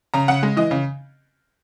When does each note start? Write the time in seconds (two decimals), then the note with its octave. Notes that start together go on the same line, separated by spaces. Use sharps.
0.14 C#3 A#5
0.28 C#3 F#5
0.43 G#3
0.57 E3 D#5
0.71 C#3